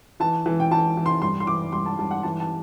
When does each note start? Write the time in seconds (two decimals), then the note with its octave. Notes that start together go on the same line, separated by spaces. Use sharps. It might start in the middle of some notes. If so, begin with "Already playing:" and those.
0.20 E3 A5
0.46 E3
0.60 G5
0.71 E3 A5
0.97 E3
1.06 C6
1.22 G2 C6
1.40 C6
1.47 E3 D6
1.72 G2 C6
1.86 A5
1.99 G2 A5
2.11 F#5
2.23 E3 A5
2.40 A5